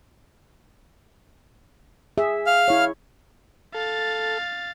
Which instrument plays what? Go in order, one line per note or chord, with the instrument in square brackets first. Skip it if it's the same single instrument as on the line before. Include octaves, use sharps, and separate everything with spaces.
[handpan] G#4 E5
[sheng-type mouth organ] F5 F6
[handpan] E4 C#5
[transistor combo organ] A4 [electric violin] F5 A6